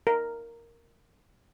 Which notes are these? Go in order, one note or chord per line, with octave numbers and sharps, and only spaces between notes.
A#4